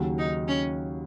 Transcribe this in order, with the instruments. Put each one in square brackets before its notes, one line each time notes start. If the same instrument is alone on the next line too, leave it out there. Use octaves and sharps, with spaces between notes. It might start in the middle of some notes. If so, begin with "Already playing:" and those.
Already playing: [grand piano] D#2 C#3 F#3
[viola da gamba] D#4
C#4